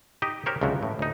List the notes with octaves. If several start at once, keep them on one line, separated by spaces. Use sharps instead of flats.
D#4 G4 D#5
G4 A#4 C5 C#5
C#2 C3 F3 F#3 F#4
A2
D2 D#4